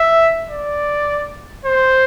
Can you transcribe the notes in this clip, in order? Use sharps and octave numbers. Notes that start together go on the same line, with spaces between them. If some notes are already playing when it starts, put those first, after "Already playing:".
Already playing: E5
D5
C5